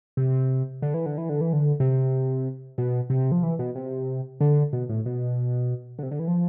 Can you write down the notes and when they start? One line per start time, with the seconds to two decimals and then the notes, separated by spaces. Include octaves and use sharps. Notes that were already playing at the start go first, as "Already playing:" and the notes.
0.17 C3
0.82 D3
0.94 E3
1.06 D3
1.18 E3
1.29 D3
1.41 E3
1.53 D3
1.80 C3
2.78 B2
3.10 C3
3.32 F3
3.43 E3
3.59 B2
3.75 C3
4.41 D3
4.73 B2
4.89 A2
5.06 B2
5.99 D3
6.03 C3
6.11 D3
6.19 E3
6.28 F3